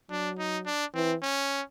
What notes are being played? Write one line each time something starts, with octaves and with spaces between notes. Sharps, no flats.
F#3 D4
D#4
D4
E3 C4
C#4